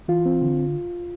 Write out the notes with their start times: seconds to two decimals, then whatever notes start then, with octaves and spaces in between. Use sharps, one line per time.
0.08 E3 F4
0.26 C4
0.42 D3